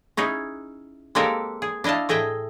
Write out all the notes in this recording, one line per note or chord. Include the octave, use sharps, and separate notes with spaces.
C#4 D#4 E4 G#4
G#3 A#3 C4 G4 A4 A#4
G#4
D4 E4 D#5 F5 A5
A2 G#4 D#5 E5 G5